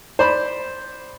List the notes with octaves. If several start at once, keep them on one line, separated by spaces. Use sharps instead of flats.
C5 D5 B5